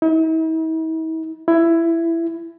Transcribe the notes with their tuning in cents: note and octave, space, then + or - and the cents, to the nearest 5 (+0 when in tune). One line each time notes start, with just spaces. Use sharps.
E4 -45
E4 +15